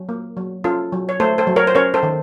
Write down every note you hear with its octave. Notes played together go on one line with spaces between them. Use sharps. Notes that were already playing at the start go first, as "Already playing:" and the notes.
Already playing: F#3
A#3
F#3
C#4 F4 A4
F#3
C#5
A3 A4 C5
A4 C5
F#3
A#4 C#5
C5
C#4 A#4 C#5
A4 C5
D#3